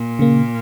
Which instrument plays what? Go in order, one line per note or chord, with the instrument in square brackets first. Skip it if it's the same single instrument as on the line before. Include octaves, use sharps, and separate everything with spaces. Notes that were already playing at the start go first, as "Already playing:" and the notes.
Already playing: [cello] A#2
[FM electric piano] C#3 A#3